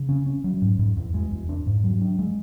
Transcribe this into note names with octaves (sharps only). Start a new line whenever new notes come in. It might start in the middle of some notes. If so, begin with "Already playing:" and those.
Already playing: C#3
C#4
C#4
F#3
G#2
G#2
E2
G#3
E2
D4
G#2
F#3
D4
G#3